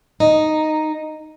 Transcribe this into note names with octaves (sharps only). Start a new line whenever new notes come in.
D#4